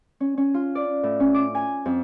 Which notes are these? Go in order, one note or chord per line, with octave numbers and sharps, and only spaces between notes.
C#4
C#4
F4
D5
A2
C#4
D6
G#5
F2